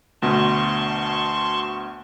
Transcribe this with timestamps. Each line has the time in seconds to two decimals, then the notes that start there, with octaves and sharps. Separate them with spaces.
0.22 D2 B2 A5 C6 C#6